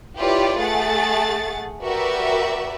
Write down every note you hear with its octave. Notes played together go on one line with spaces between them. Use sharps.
E4 F4 G4 B4 C#5 D5
A3 G#4 F#5 A6
F#4 G4 A#4 B4 D5 E5